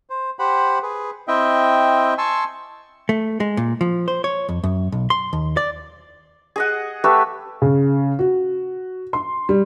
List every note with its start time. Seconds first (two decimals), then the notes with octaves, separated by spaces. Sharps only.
0.10 C5
0.39 G4 C5 F#5 B5
0.83 G#4 B4
1.28 C4 E4 D#5 E5 G5
2.18 G#5 A5 C6 C#6 E6
3.09 A3
3.40 G#3
3.57 A#2
3.81 F3
4.08 C5
4.24 C#5
4.49 F2
4.63 F#2
4.92 B1
5.10 C6
5.33 D#2
5.57 D5
6.56 G#4 D#5 F#5
7.04 A3 G4 B4 E5
7.62 C#3
8.19 F#4
9.13 C6
9.49 G3